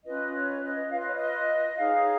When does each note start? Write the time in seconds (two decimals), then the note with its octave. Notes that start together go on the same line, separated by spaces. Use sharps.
0.04 C#4 F4 B4 D#5
0.33 C#5
0.62 D#5
0.90 F4 B4 F5
0.98 D#5
1.06 C#5
1.14 D#5
1.76 D#4 G#4 C#5 F5